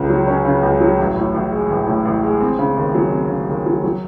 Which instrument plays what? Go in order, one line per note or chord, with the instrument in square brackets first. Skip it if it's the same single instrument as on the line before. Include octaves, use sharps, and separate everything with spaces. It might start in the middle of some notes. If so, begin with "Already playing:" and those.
Already playing: [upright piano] C#2 C#3 C#4
F#3
C#4
C#3
C#2
F#3
A1
A2
A1
G#3
A1
A2
A1
G#3
C4
C#3
D#2
F#3
C4
C#3
D#2
F#3
F#3